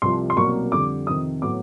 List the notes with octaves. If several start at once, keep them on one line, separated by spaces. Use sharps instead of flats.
C2 C3 F3 C6
C6
C2 B2 F#3 A#3 C#6
F2 D3 G3 D6
F2 C3 D#3 D#6
A2 F#3 B3 D6